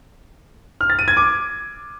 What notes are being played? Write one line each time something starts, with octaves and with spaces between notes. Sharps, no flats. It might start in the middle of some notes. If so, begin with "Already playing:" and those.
F6
A6
D#7
G#6
D6